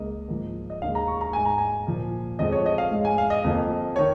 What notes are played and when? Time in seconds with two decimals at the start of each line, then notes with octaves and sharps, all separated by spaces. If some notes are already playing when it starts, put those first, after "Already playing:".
Already playing: C#2 C#3 A#3 D#5
0.28 G#2 F3 A#3
0.70 D#5
0.82 D#2 C#3 G#3 F5
0.95 A#5
1.08 C#6
1.21 A#5
1.33 G#2 G#3 G#5
1.45 A#5
1.58 G#5
1.87 A#2 F3 A#3
2.39 F2 F3 G#3 D#5
2.52 C#5
2.66 D#5
2.78 F5
2.91 G#2 G#3
3.05 G#5
3.18 F5
3.30 D#5
3.44 F2 F3 A#3
3.96 D#3 C#5